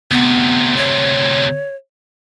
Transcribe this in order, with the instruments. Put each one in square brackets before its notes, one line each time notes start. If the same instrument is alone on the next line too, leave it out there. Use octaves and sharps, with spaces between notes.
[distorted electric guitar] D2 C3 [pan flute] B3
[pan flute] C#5